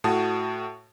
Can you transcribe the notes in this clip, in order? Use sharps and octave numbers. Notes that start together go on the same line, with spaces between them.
A2 F#4 A5 D#6